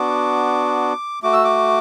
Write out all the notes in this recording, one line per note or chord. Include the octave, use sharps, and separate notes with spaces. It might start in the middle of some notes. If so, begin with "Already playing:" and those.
Already playing: B3 D4 F#4 D6
A3 F#4 D6
E6
D6